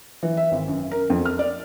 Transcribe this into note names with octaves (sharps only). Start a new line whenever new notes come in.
E3
E5
G#1
F#2
A#4
F2
F6
D5